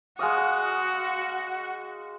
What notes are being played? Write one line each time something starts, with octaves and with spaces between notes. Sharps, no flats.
G#3 F#4 F5 D#6